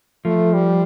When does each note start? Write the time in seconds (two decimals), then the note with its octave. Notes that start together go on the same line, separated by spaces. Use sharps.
0.25 F3 A3
0.54 G3